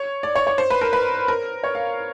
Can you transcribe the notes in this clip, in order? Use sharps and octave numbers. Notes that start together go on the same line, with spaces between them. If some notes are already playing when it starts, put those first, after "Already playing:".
Already playing: C#5
D5
C#5
C#5
C5
B4
A#4
B4
A#4
C#5
F5